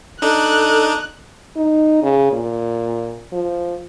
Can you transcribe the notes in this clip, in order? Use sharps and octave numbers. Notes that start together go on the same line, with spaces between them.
D4 D#4 A4 F#6
D#4
C#3
A#2
F3